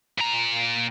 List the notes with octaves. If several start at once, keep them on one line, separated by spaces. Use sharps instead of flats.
A#2 A#5